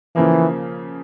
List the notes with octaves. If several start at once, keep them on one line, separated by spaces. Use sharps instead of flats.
C#3 E3 F3 A#3